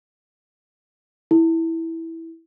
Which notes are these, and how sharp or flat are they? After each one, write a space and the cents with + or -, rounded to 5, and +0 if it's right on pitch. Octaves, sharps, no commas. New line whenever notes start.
E4 -5